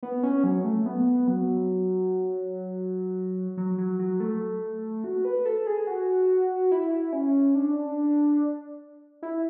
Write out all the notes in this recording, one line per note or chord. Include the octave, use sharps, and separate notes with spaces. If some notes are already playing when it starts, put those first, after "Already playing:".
B3
C#4
F#3
A3
B3
F#3
F#3
F#3
F#3
A3
F#4
B4
A4
G#4
F#4
E4
C#4
D4
E4